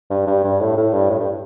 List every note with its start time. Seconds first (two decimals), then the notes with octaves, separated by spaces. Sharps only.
0.11 G2
0.27 G2
0.44 G2
0.61 A2
0.78 A2
0.93 G2
1.10 A2
1.20 G2